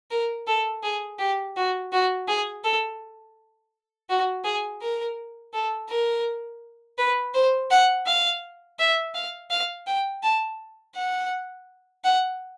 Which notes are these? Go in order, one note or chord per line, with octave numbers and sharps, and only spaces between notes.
A#4
A4
G#4
G4
F#4
F#4
G#4
A4
F#4
G#4
A#4
A4
A#4
B4
C5
F#5
F5
E5
F5
F5
G5
A5
F#5
F#5